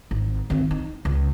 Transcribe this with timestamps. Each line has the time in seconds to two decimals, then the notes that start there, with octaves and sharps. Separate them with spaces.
0.11 G#1
0.50 D#3 C4
0.71 D#4
1.05 C#2